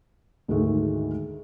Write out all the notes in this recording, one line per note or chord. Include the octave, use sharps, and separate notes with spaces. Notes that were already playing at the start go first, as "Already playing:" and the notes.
D2 G#2 D#3 G#3 A3